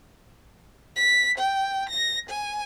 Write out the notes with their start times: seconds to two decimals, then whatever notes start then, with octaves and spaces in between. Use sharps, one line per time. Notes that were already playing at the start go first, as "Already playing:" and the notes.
0.96 B6
1.38 G5
1.89 A#6
2.29 G#5